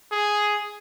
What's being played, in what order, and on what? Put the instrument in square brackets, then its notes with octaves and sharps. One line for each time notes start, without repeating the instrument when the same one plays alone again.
[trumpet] G#4